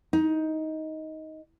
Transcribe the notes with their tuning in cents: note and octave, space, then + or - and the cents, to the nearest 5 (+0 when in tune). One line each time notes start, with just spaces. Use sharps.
D#4 +15